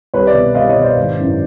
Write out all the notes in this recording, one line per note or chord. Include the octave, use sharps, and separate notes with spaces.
C2 B4 C#5
D5 E5
B2
C2 D#5 F5
C#5 D#5
B2
C5 D5
G#1
F#2 C#3 E3